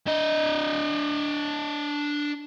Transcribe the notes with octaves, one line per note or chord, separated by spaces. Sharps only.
D4 D#5